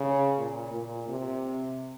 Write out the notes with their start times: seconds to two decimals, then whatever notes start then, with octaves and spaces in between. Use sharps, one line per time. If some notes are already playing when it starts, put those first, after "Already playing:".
Already playing: C#3
0.38 A#2
0.73 A#2
1.08 C3